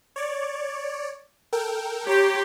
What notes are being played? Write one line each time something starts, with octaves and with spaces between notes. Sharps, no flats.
C#5 D5
A4 A#4 G5
G4 C#5 A#5 C6